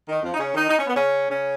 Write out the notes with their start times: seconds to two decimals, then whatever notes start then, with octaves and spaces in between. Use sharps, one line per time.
0.08 D#3
0.23 F2 F3
0.34 D#4
0.38 C#3 C#4
0.54 D#3 D#4
0.68 D#4
0.78 C#4
0.87 B3
0.95 C#3 C#4
1.28 C#3 C#4